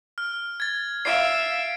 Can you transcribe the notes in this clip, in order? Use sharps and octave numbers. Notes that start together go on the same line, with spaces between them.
F6
G#6 A6
E5 F5 C7 D7